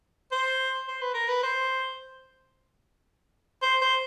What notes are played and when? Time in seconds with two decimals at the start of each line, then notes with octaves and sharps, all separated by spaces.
0.32 C5
0.88 C5
1.01 B4
1.14 A#4
1.28 B4
1.43 C5
3.63 C5
3.82 C5